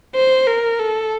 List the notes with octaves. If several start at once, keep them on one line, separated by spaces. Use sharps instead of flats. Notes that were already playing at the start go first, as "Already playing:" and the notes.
C5
A#4
A4